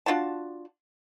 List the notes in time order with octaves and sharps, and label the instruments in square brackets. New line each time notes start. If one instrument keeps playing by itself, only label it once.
[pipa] D4 F4 F#4 A5